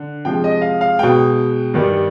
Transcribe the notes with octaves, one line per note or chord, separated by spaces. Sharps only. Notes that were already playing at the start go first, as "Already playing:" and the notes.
Already playing: D3
C3 F3 G#3 G5
D#5
F5
F5
B2 G#3 G5
G2 D#3 G3